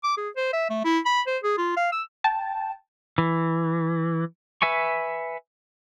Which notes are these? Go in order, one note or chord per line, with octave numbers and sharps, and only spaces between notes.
D6
G#4
C5
E5
A3
E4
B5
C5
G#4
F4
F5
E6
G5 A5
E3
B4 E5 G#5 C#6